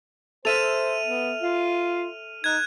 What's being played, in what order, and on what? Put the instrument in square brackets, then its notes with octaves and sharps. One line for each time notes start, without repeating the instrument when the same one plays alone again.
[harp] A4 E5 [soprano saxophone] C5 [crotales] F6 D#7 F7
[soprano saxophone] B3
F4
[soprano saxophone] D#4 [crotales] F#6 G#6